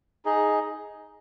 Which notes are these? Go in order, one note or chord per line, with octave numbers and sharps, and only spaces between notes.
D#4 G#4 D#5